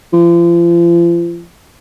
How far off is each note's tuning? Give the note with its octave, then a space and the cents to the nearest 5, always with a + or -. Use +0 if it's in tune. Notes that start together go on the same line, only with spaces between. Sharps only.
F3 -40